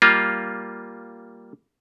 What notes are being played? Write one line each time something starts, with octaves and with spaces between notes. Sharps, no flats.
G3 A#3 F4